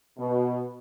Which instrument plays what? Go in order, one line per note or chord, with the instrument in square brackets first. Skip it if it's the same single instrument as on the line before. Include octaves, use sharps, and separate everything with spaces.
[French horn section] B2